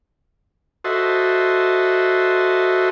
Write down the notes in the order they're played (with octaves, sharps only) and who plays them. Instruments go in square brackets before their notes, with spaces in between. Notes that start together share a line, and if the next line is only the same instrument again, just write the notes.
[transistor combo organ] F#4 A4 C5 D#5 E5